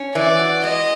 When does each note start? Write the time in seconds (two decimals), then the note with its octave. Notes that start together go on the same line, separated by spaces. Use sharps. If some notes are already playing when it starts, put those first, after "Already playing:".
Already playing: C#4
0.15 E3 D5
0.39 F#4
0.64 G#3 D#5